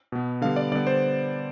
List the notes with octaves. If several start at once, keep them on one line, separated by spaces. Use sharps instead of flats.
B2 B3
D3 G3 B3 F5
D5
D3 G3 B3 D5
C5